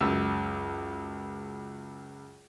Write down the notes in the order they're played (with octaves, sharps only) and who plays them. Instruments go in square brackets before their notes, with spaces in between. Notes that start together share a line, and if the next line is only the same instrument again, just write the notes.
[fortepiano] C#2 F#2 E6